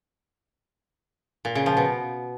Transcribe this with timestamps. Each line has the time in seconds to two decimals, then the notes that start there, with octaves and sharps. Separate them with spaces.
1.45 A#2
1.55 C#3
1.66 F3
1.77 B2